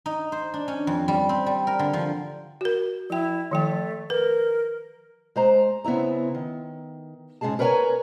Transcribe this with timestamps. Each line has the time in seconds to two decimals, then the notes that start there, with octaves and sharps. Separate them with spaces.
0.06 D#4
0.32 C5
0.54 D4
0.68 C#4
0.87 F2
1.08 G3
1.29 C4
1.46 G3
1.67 A#4
1.79 D3
1.93 F3
2.61 F#4 A#4
3.10 F3 E4 G5
3.51 D#3 F3 A3 G5
4.10 A#4 B4
5.36 G#3 C5 A#5
5.84 C#3 B3 C4 E4 A#5
6.35 D#3
7.41 G#2 C#3 F3 G#3 G#4 A5
7.59 A#4 B4 C#5 F#5 G#5 A#5